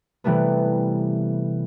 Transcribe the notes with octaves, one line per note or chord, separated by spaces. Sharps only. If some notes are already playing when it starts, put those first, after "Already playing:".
C3 E3 G3 A3 B3